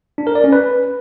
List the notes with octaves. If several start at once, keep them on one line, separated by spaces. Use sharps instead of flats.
D4
A#4
D5
C#4
B4